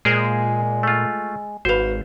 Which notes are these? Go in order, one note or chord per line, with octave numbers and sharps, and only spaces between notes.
A#2 G#3 G#4 A#4 C5
A3 F4
G#1 F#4 B4 C5 F5